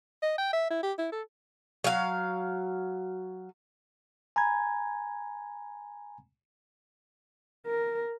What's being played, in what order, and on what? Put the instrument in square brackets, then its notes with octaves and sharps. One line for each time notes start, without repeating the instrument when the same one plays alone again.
[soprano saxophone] D#5
G5
E5
E4
G4
E4
A4
[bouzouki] F#3 F5
[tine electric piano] G#5 A#5 B5 G#6
[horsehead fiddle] A#4